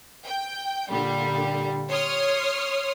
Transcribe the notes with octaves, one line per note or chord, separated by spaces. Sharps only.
G5
A#2 D3 G3
C#5 C6 D#6 F6